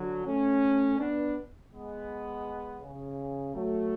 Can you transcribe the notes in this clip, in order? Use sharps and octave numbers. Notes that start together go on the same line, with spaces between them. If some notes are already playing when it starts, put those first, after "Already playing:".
Already playing: D3 F#3
A3 C#4
B3 D4
G#3 B3
C#3
F#3 A3